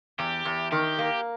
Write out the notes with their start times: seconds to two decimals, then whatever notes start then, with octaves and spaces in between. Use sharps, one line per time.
0.19 E2 G4
0.45 E2
0.72 D#3 G4
0.99 A#3